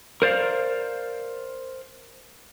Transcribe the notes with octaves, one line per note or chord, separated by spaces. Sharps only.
A#4 C5 D5 F5